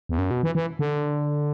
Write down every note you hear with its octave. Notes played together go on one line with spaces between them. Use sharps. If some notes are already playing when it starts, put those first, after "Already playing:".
E2
F#2
B2
E3
E3
D3